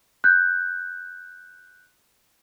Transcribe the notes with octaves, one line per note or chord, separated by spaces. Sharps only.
F#6 G6